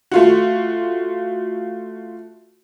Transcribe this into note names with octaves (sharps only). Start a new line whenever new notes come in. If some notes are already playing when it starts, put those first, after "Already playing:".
A3 F4 F#4